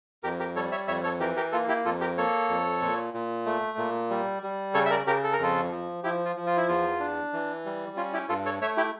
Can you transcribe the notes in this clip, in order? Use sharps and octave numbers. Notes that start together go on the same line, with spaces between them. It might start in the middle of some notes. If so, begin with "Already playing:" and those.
F2 G4 A#4
G4 A#4
G3 A4 C#5
C#5 E5
F2 C#5 E5
A4 C#5
E3 G4 A#4
G4 A#4
A#3 F4 A4
E4 G4
F2 F4 A4
G4 A#4
A#3 A4 C#5
F2
A#2
A#2
A3
A#2
G3
G3
C#3 A4 C#5
E5
A#4 D5
C#3 G4 A#4
A4
A#4
F2 F4 A4
F3
F3 E4 G4
F4
F3
F4
E4
E2 F4
D4
E3
G3
C#4 F4
E4 G4
G2 F4 A4
A4 C#5
A3 C#5 E5
E4 G4